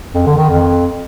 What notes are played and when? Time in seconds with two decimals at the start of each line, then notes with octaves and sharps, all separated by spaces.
0.14 F2
0.26 D3
0.38 D#3
0.49 F2